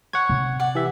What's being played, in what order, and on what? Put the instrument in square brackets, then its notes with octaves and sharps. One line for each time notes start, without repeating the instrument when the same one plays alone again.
[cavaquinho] C#5 [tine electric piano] F#5 G#6
[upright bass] C3
[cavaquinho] D5 F#5
[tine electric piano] E3 G4 E5